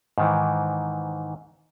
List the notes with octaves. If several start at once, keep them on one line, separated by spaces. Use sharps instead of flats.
G#2 D#3 E3